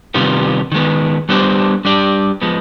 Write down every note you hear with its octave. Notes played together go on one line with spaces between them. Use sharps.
C3 D#3 G3 B3 F4
D#3 G#3 B3
G3 B3 D4 G4 C5
G3 D4 G4 D5
F3 G#3 B3